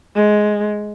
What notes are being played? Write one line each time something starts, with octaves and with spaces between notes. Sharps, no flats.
G#3